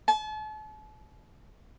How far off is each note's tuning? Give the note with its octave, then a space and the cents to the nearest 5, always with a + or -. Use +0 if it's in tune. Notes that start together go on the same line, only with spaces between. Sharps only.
A5 -40